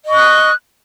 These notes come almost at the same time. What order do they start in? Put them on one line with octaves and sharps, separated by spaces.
D#5 C#6 F#6 D#6